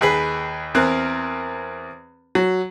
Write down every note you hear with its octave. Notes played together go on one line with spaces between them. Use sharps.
D#2 G#4 B4
E2 C4 A#4 F#6
F#3